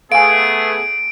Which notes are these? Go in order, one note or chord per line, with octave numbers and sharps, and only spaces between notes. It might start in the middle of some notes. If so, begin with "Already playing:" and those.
A3 B3 G#4 F5 G#5 D7